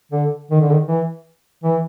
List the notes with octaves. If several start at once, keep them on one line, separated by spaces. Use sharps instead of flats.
D3
D#3
D3
D#3
E3
E3